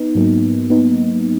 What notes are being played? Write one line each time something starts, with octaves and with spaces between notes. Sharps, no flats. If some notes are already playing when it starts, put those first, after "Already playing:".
Already playing: B3 D#4
G#2 F#3 A#3
B3 D#4